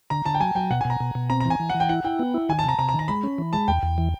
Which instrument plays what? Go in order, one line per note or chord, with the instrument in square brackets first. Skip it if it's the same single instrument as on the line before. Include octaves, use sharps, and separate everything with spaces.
[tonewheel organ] D3 [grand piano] A#5
[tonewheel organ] D3 [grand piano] A5
[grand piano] G5
[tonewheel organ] F#3 [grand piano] G#5
[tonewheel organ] F#3 [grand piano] G5
[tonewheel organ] B2 [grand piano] F#5
[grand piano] G#5
[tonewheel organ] B2 [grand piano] A#5
[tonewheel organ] B2
B2
[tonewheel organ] C4 [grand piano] A#5
[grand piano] A#5
[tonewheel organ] E3
[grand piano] G#5
[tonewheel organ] E3
[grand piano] F#5
[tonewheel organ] E3
[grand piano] G5
[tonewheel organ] E4 [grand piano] F#5
[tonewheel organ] E4 [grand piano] G5
[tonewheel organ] B3
E4
[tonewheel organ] D#3 [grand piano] G#5
[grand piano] A5
[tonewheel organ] C3 [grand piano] A#5
[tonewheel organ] C3 [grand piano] A#5
[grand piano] A#5
[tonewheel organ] D#3
[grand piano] A#5
[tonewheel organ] G#3 [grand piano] B5
[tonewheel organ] C#4
E3
[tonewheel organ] G#3 [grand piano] A5
[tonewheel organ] E2 [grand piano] G5
[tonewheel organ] E2
E3